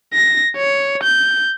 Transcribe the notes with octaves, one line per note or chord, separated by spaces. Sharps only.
A#6
C#5
G6